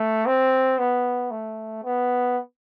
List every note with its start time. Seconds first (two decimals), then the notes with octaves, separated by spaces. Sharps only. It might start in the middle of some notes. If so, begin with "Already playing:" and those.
Already playing: A3
0.26 C4
0.79 B3
1.31 A3
1.84 B3